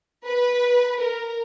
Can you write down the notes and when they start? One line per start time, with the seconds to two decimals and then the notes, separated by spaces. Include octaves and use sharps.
0.25 B4
1.01 A#4